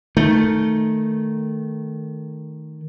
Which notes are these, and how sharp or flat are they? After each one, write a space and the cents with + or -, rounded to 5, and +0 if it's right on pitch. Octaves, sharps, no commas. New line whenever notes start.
D#3 +0 A3 +0